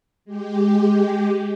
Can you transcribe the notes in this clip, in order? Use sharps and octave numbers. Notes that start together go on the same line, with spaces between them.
G#3 G4